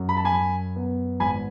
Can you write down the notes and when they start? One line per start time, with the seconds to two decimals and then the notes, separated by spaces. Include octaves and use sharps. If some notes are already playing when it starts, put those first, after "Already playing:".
Already playing: F#2
0.09 B5
0.17 A5
0.25 G#5 B5
0.32 F#2
0.76 B3
1.20 G#1 G#5 B5